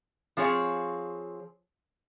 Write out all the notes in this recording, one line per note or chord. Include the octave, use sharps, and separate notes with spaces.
F3 C4 G#4 C#5